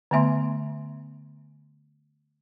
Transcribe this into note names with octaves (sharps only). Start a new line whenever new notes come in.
D3 A3 B3 E5 C6